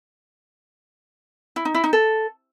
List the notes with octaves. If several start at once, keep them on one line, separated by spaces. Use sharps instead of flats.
E4
D#4
E4
D#4
A4